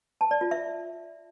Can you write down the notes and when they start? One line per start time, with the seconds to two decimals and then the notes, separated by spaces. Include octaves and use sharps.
0.21 A5
0.31 D5
0.41 F4
0.51 E5